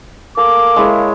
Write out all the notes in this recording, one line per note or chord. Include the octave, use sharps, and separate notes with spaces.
A#3 A4 D6
G#3 E4 C#5